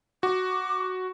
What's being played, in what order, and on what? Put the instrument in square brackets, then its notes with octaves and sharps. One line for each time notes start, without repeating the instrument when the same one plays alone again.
[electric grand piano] F#4 [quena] D6